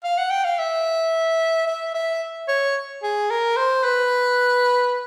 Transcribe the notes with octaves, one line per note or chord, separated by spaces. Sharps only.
F5
F#5
G5
F5
E5
E5
E5
C#5
G#4
A#4
C5
B4